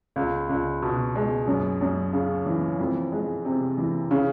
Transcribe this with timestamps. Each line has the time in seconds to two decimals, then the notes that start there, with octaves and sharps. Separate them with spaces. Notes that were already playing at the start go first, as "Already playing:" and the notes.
0.16 C#2
0.49 C#2
0.82 B2
1.15 G#3
1.47 F#2
1.81 F#2
2.13 C#3
2.46 E3
2.79 F2
3.12 G#3
3.45 C3
3.78 E3
4.11 C#3